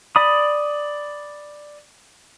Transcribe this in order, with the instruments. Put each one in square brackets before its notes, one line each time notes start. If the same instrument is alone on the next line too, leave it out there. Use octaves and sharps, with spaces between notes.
[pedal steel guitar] D5 B5 D#6